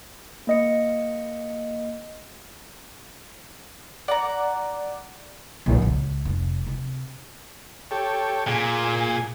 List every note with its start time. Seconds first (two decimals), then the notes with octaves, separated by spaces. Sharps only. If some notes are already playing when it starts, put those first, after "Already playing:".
0.47 A#3 D#5 C#7
4.08 D5 F#5 A#5
5.66 A#1
5.82 C#2
6.25 F1
6.67 C3
7.91 G4 A4 C#5
8.48 A#2 G#4 G#5